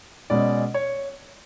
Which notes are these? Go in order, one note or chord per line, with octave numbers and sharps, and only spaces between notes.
B2 G#3 C#4 D5
C#5